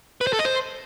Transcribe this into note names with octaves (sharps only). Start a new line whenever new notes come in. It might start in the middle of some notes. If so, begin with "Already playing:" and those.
B4
C5
A4
D#5
C5